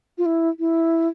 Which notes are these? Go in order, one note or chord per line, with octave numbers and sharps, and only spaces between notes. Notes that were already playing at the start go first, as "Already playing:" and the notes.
F4
E4
E4